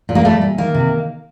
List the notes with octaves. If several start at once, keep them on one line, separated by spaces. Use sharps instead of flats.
A#2
A#3
G3 A3
A#2
D#3 A#3
C3